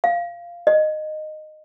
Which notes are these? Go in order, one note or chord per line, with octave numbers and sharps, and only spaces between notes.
F5
D#5